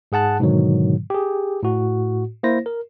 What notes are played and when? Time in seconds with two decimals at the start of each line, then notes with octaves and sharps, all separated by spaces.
0.12 G#2 G#4 F#5 A5 F#6
0.39 G#2 B2 D3 D#3 F#3
1.10 G4 G#4
1.63 A2 F#4
2.43 A#3 E4 C5 A#6
2.66 A#4